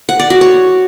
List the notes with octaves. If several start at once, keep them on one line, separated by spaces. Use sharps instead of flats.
F#5
D5
F#4
C#5